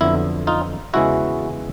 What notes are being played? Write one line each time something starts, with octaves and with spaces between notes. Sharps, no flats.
F2 D3 F#3 B3 E4
D#4 F4
E2 C#3 E3 G#3 C#4 E4 F#4